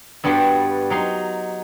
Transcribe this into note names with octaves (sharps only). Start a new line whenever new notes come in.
G2 G3 B3 F#4 A5 C6
F#3 D#4 C6